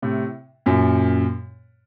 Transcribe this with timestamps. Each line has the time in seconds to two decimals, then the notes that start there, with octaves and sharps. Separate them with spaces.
0.02 A2 C3
0.66 F#2 A#2